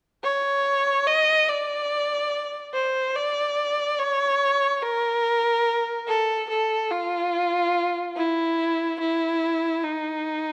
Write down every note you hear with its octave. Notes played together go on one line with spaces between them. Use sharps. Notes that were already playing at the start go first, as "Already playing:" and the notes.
C#5
D#5
D5
C5
D5
C#5
A#4
A4
A4
F4
E4
E4
D#4